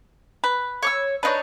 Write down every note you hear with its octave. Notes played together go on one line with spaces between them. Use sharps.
B4
C#5 D6 E6
D4 D#4 B4 C#5